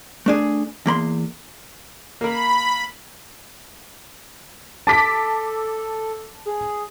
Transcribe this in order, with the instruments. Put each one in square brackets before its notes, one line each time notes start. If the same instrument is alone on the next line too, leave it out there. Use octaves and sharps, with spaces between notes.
[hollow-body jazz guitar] A3 D4 G#4
E2 A#3 B5 C6
[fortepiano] A#3 A#4 [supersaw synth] B5
[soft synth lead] A4 [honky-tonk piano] A5 D6 B6
[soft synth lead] G#4